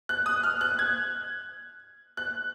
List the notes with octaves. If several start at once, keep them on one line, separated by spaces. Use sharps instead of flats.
F#6
D#6
F6
F#6
G#6
F#6